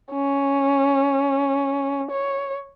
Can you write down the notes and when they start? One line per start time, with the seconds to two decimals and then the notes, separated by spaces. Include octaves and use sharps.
0.12 C#4
2.11 C#5